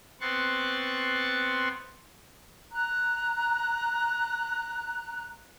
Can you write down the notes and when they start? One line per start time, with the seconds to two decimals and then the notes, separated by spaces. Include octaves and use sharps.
0.21 B3 C4 C6 C#6 F#6 A6
2.70 A#5 F#6